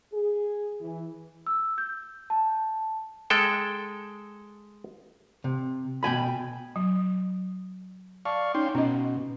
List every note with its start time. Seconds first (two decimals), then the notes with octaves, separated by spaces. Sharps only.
0.12 G#4
0.80 E3
1.47 E6
1.78 G6
2.30 A5
3.30 G#3 A4 G5
5.44 C3
6.03 B2 G5 G#5 B5
6.76 F#3
8.25 D5 F5 A5 C#6
8.55 C#4 D#4 G5 C6
8.75 B2 C#4 D#5